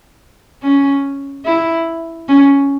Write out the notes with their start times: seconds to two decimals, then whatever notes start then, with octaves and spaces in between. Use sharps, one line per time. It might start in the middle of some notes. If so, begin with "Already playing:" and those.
0.62 C#4
1.45 E4
2.28 C#4